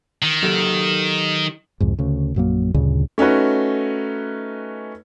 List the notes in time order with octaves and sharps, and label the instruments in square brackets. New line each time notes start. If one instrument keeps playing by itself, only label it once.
[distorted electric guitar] D#3
[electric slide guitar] F#3 G4 A4
[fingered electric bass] C2 F2 G#2
D2 C#3
A#1 F#2 F#3 A#3
D2 G2 A#2 C#3
[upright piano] A3 C#4 D#4 F#4 B4